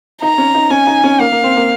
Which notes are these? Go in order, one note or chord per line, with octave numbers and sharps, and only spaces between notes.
D#4 A#5
C#4
D#4
C#4 G#5
D#4
C#4
A#3 F5
A#3
C4
A#3